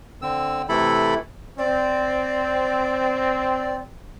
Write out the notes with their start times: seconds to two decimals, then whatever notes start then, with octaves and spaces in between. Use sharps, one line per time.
0.22 D3 C4 E6
0.69 C3 E3 A3 E4 A4 B5
1.58 C4 D5